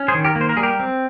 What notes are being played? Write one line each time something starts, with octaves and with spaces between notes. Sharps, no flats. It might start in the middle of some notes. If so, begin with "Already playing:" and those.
Already playing: C#4
G#4 C5
D#3
G4 A#4
A#3
C5
A#4
G3 G#4
G4 A#4
C4